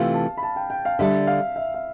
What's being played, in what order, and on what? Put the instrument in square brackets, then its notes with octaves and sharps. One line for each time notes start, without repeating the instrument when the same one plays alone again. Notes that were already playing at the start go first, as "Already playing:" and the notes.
Already playing: [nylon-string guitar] C3 E3 A3 F4 [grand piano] F5
[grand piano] A5
B5
A5
G5
G5
F5
[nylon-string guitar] D3 G3 D4 A4 [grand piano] E5
[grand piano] F5
E5
F5